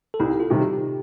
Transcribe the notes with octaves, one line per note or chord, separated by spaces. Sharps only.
A4
C2 D#4 G4
F4 A4
C3 D#3 G3
D#4 G4